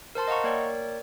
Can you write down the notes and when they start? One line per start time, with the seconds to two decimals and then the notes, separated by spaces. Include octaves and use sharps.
0.15 A#4 C5 A5 C6
0.28 D#5 F5 F#5 A#5 C#6
0.44 A#3 A#4 C#5 D5 G5